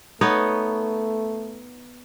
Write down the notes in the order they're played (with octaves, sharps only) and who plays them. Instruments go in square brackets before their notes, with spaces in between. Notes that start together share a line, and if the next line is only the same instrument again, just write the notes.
[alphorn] A3 [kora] B3 D#4 C#5